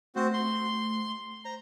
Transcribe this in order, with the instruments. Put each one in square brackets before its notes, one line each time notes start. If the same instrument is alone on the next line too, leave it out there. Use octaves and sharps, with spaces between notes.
[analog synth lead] A3 [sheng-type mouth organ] C4 F#4 C5
[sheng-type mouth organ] C6
[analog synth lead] C5 [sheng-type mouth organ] A#5